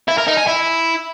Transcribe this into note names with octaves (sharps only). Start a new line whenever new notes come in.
E4
A#4
D#4
G#5
E4